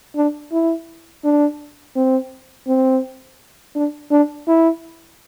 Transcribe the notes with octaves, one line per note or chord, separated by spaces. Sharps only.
D4
E4
D4
C4
C4
D4
D4
E4